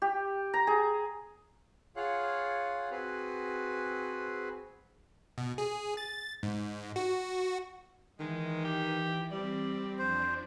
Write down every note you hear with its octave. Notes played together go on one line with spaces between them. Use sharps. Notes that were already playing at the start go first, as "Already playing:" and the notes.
G4
A#5
G#4
F4 G#4 C#5 F5 F#5
C4 F#4 G#4 B4
B2
G#4
A6
G#2
F#4
D#3 E3 G#3
G4
G3 C4 D5
F2 F3 D4 C5